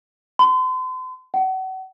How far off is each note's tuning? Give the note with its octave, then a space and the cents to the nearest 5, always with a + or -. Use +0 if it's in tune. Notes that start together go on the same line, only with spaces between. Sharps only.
C6 -40
F#5 +35